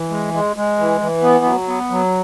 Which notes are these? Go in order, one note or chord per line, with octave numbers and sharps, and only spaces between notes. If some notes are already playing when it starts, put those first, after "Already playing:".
Already playing: E3
G#3
G#3
G#3
E3
E3
B3
F#3
B3
F#3